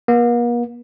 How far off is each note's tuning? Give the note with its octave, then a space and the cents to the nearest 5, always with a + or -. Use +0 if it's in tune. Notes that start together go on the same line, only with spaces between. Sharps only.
A#3 +45